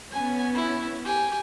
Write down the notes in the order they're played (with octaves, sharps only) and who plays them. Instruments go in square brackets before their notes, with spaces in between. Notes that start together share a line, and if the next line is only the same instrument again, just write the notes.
[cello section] B3 C#4 [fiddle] G#5
[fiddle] E4
G4 G#5